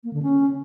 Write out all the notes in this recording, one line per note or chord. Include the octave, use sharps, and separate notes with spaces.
A#3
D3
C#4